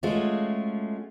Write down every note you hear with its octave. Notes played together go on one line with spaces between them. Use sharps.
G#3 A3 C#4 F4 F#4